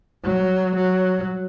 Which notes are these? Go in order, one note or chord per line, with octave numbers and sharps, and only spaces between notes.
F#3
F#3